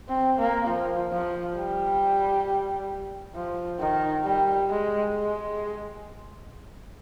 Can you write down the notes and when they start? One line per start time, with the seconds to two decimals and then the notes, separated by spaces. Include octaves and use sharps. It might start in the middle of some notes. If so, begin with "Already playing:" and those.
0.08 C4
0.39 A#3
0.67 F3
1.13 F3
1.57 G3
3.35 F3
3.80 D#3
4.24 G3
4.70 G#3
5.14 G#3